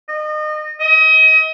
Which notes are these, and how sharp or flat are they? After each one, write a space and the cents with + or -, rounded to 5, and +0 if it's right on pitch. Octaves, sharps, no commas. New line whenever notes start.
D#5 -30
D#5 +30